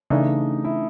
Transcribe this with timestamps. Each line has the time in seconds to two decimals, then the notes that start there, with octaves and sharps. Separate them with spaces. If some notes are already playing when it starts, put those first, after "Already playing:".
0.10 C#3 E3 A3 D4 D#4
0.65 E4